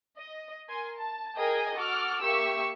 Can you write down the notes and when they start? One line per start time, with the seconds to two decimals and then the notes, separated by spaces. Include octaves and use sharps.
0.19 D#5
0.68 A#4 G#5 C6
0.97 A5
1.36 G#4 A#4 D#5 G5 G#5
1.74 F#4 A4 D6 F6
2.22 A#3 G4 E5 C#6 E6